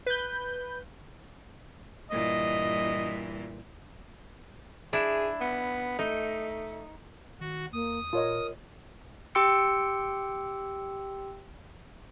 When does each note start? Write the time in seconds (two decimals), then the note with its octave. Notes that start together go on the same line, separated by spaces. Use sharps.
0.06 B4 G6
2.11 G2 A#2 E3 D#5
4.93 D4 E4 G#4
5.41 B3
5.99 A3 D#4
7.41 D#3 F#4
7.73 E2 A#3 D#6
8.13 A#2 F4 A#4 C#5 D#5
9.35 G4 G5 C6 E6 C#7